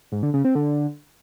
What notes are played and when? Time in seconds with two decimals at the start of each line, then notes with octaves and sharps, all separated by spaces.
0.12 G#2
0.23 D3
0.34 C#3
0.44 C4
0.55 D3